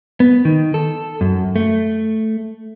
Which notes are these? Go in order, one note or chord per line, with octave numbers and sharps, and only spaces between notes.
B3
D#3
A4
F#2
A3